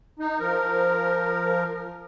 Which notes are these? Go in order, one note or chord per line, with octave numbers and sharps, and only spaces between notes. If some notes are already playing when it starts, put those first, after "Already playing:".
D#4
F3 A#4